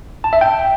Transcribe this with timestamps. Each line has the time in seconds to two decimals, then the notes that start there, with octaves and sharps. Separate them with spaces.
0.24 A5
0.33 E5
0.41 G5